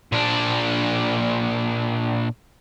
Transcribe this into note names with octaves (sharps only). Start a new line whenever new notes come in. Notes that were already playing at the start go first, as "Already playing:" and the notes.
A#2 D4